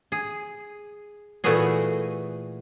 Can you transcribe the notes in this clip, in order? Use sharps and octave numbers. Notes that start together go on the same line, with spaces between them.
G#4
A#2 E3 A3 B3 F#4 G#4